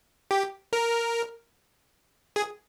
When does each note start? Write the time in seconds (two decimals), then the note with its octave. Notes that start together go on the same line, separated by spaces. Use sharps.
0.31 G4
0.73 A#4
2.36 G#4